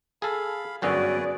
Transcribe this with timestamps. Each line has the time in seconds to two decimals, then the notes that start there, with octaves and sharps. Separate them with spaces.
0.22 G#4 A4 F5 B5
0.82 G1 F#2 C#4 F#4 G#4 B4 D5